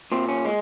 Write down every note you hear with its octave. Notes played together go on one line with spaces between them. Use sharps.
A#2 C4
C#4
G#3